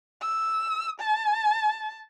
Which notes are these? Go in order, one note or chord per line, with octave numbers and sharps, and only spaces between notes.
E6
A5